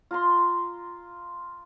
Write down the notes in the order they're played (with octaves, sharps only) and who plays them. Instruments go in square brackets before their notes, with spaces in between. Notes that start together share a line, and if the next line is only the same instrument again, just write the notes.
[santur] F4 A#5 C6